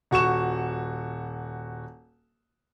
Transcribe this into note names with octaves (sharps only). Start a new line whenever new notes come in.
D#1 F#4 C#6 E7